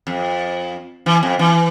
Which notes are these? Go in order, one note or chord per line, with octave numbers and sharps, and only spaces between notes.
F2
E3
F2
E3